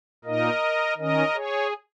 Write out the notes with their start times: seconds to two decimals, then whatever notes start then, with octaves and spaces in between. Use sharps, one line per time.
0.24 A#2 A#3 D#4 A#4 D#5
0.97 D#3 C#4 A#4 D#5
1.35 G#4 C#5